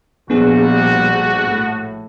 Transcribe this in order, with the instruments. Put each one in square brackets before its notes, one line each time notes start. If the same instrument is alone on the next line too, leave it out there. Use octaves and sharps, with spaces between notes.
[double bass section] A#1 G3 [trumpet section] A3 F#4 [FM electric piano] B3 D4 G#4
[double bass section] A2